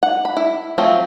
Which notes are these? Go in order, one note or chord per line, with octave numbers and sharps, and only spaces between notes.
F#5
B5
E4
F3 F#3 A3 C4 F4